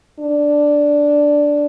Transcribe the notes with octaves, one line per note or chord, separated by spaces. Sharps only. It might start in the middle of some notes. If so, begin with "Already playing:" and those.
D4